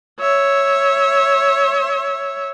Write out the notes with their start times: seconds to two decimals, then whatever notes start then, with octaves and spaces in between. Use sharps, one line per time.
0.20 C#5 E5